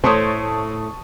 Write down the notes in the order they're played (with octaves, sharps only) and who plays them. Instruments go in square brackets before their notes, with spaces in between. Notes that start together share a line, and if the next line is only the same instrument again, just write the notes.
[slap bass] A2 [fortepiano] A3 C#5 [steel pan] C5 [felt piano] A5 C#6 D#6